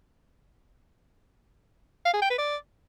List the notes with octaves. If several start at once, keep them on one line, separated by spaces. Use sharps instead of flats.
F5
G#4
G5
B4
D5